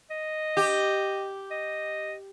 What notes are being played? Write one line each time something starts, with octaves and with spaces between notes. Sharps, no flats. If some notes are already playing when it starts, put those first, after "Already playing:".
D#5
G4
D#5